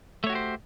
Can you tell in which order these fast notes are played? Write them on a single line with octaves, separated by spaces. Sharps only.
A3 C#5 F#4 G4 C5